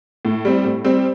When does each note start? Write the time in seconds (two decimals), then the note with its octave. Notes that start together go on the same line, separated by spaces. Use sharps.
0.25 A2
0.45 G3 C4
0.65 A2
0.85 G3 C4